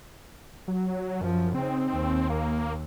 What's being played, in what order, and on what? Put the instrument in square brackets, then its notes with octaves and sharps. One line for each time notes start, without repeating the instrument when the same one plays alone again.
[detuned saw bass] F#3
[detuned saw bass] F#2 [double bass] F3
[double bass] C#3 D#4 [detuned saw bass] C4
[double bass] D#2
[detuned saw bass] A#3